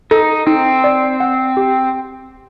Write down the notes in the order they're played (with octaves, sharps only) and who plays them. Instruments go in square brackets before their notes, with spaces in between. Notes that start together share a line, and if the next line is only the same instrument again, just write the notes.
[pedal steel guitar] D#4 [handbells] A4
[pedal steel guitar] C4 [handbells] D#4
[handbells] D5
F#5
G4